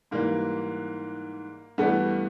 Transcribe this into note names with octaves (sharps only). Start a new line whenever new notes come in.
G#2 E3 G3 A#3
G2 E3 G3 A3 B3